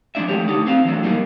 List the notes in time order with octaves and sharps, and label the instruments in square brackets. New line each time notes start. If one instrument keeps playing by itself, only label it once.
[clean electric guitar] F3 G#3 A#3 D4 D5 E5
F3 F#3 G#3 A3 G4 C#5
D3 A3 D#4 D5
C4 C5 F5
E3 F#3 A3 D4
A#2 G3 A#3 D#4 F4